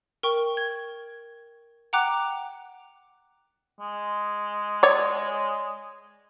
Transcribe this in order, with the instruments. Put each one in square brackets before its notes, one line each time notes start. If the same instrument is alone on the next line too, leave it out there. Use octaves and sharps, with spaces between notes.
[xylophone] A#4 G5 C#6
G#6
F#5 G5 A#5 D6 F#6
[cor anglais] G#3
[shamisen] C#5 D5